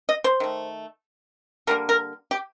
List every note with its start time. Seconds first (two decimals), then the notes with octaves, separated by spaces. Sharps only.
0.09 D#5
0.24 C5
0.40 D#3 A3
1.67 D3 G3 A#3 A#4
1.89 A#4
2.31 G4